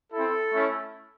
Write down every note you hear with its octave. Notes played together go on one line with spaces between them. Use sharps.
C4 E4 A4
A3 C#4 E4